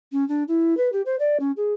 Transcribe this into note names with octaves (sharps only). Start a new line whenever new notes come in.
C#4
D4
E4
B4
G4
C5
D5
C#4
G#4